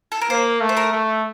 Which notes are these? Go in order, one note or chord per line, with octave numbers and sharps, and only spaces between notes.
A4
A#4
A#3 C5
A3
C5
A#4
A3